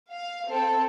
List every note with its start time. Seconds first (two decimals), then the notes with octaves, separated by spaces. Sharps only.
0.11 F5
0.49 C4 A4